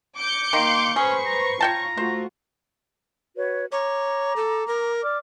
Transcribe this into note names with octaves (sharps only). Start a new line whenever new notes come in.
D6 G6 C#7
D#3 A#3 F5 C6
C#4 G#4 B4 C5 C#6
A#5
F4 C#5 G5 A5 A#5
A3 F4 F#4 C5
F#4 B4 C#5
C#5 A#5 D6
A4
A#4
D5 D6 F6